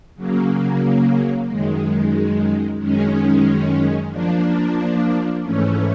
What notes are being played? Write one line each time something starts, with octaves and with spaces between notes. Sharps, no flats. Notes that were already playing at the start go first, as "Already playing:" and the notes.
C#3 F#3 A#3
F#2 D#3 G#3
F#2 D#3 G#3 C#4
F3 A#3 D4
G#2 E3 A3 C#4